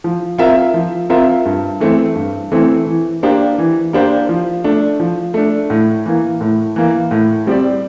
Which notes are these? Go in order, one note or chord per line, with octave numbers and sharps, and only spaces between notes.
F3
C4 F4 A#4 E5
F3
C4 F4 A#4 E5
G2
E3 A3 C4
G2
E3 A3 C4
E3
A#3 D4 G4 C5
E3
A#3 D4 G4 C5
F3
A3 D4
F3
A3 D4
A2
E3 A#3
A2
E3 A#3
A2
G3 C4 G4 D5